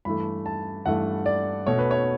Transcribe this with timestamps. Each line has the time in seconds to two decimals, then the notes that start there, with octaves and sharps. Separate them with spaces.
0.05 G2 E3 A3 B5
0.46 A5
0.86 G2 E3 A3 F#5
1.26 D5
1.66 B2 A3 C#5
1.79 B4
1.91 C#5